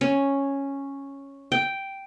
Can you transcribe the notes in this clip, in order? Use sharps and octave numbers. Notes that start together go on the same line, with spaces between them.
C#4
G5